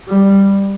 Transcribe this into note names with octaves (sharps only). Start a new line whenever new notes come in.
G3